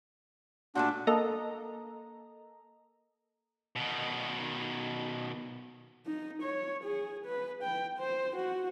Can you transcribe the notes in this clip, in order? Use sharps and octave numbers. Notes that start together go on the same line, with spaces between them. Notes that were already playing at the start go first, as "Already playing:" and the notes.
A#2 G3 A3 D4 F#4
A#3 A4 D#5 A#5
B2 D#3
D#4
C#5
G#4
B4
G5
C5
F#4